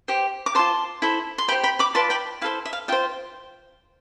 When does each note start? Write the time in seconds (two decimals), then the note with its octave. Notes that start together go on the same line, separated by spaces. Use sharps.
0.08 G4 C5
0.46 D6
0.55 F4 C5 A5 C6
1.02 E4 A4 C5
1.38 C6
1.48 G4 G5 B5
1.52 C5
1.63 G5 B5
1.79 B5 D6
1.94 F4 B4 D5 A5 C6
2.10 G5 B5
2.41 E4 A4 C5 F5
2.65 E5
2.73 F5
2.88 F4 C5 E5 G5